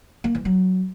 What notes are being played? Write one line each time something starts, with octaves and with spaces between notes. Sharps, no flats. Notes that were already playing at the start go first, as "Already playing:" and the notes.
A#3
E3
F#3